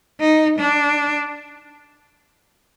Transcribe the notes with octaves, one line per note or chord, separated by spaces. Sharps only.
D#4
D4